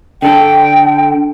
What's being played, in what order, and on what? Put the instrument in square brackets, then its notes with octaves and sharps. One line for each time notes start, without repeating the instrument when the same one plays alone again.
[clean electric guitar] D3 A4 [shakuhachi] G5